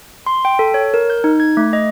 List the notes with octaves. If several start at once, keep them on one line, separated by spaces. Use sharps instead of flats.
C6
G5
A4
C#5
A#4
G6
D#4
G#6
A3
D#5